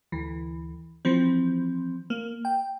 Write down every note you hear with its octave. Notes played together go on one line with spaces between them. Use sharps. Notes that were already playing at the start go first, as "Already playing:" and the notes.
D2 E3
E3 F3 C4
A#3
G5